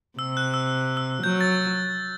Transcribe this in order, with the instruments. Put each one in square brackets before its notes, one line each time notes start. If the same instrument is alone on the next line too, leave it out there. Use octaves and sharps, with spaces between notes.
[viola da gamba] C3 [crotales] E6
[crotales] F#6
E6
E6
[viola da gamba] F#3 [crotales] G6
[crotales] A6